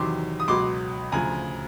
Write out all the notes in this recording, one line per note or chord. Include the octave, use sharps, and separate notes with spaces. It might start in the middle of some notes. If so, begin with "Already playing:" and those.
Already playing: E2 C3 D#3 F#3 C6 D6
D#6
C#2 B2 F#3 C6 D6
D2 C#3 F3 G#5 A#5